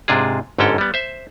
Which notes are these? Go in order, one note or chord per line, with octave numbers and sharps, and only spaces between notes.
G#2 C3 D4 F4 G#4
G1 G#2 D3 C#4 A4 G5
G3 B3
C5 E5